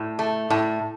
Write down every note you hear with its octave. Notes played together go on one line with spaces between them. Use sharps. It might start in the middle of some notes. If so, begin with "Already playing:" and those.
Already playing: A2
A3
A2